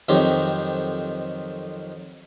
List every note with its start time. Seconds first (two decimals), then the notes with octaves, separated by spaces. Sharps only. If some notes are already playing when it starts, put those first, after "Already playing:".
0.09 F2 D#3 F#3 G4 C5